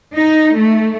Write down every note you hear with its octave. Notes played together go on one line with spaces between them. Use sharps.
D#4
A3